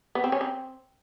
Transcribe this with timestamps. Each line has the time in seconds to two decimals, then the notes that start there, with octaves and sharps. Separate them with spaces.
0.15 B3
0.24 C4
0.32 C#4
0.41 C4